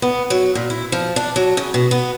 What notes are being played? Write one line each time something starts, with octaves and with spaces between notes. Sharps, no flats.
B3
F#3
A#2
E4
F3
D4
F#3
C#3
B2
B3